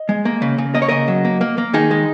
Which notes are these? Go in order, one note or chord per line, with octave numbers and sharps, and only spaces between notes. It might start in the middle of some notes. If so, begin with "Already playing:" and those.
Already playing: D#5
G#3
A#3
C#3
C#3
A#3 D#5
C#5
C#3 A#4 D#5
F#3
A#3
A#3
A#3
D#3 D#4 G#4
G#3